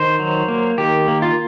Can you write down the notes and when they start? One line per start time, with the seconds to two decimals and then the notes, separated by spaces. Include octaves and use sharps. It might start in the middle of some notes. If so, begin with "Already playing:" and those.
Already playing: D#3 C5
0.19 F#3
0.48 A#3
0.78 D#3 G4
1.08 A#3
1.22 F4